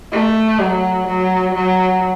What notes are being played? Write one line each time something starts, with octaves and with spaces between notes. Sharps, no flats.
A3
F#3
F#3
F#3